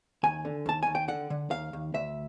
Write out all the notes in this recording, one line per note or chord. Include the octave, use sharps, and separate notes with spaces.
D#2 G#5
D3
D#2 A5
D#2 G#5
G5
D3 F#5
D3
D#2 F5
D#2
D2 E5